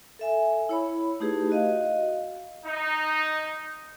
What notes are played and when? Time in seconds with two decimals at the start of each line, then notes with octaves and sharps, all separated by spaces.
0.19 A4 E5 G#5
0.69 E4 C#5 B5
1.20 A3 D#4 E4 G4 G#4 B4
1.50 F#4 D#5 F5
2.65 D#4